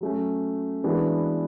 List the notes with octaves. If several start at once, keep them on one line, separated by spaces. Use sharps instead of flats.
F#3 A3 C#4
E3 G#3 B3 D4 F#4